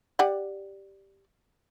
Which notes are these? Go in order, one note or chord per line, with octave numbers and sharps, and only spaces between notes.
G4 D5 F#5